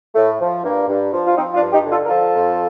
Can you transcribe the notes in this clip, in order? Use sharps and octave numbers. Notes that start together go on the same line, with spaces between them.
A2 A3
F3
G2 A#3
G2
F3
F4
F3 C4 D#4
D4 F4
G2
D#4 G4
D3
F4 A4
A#4
F3 F4 A4
F2